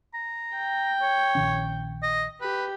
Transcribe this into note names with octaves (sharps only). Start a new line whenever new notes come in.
A#5
G5
C#5
A#1 D#3 C#4
D#5
G4 B4